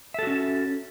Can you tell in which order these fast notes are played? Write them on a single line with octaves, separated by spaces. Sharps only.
E5 A4 F#4 C#4